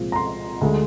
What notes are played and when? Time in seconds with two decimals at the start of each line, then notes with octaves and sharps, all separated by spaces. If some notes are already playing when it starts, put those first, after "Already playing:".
Already playing: C2 A#2 F3 G#3 C4
0.12 A#5
0.16 C6
0.61 D2 D3 G#3